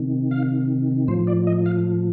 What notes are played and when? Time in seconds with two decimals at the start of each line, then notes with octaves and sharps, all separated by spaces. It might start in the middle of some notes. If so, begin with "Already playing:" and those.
Already playing: C3 D#3
0.31 F5
1.08 A2 F3 C5
1.27 D5
1.47 D#5
1.66 F5